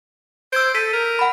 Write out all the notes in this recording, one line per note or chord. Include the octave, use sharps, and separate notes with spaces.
C5 E6 G#6 D7
A4 G6 B6 D#7
A#4
F#5 B5